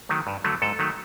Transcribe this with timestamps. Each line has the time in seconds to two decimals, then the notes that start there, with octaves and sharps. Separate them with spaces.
0.09 D#3 F#3 A3
0.27 G2
0.44 D3 F#3 A3
0.62 G#2 A4
0.79 D#3 F#3 A3